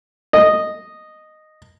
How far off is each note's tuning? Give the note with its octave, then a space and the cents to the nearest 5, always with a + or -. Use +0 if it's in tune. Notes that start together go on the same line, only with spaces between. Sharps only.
D#5 -5